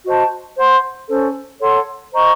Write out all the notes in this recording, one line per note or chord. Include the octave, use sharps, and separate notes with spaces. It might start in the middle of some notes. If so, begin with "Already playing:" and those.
F#4 C5 D#5 A5
C5 F#5 C6
C#4 A4 C5
A4 C#5 F#5 C6
C5 D#5 A#5 C#6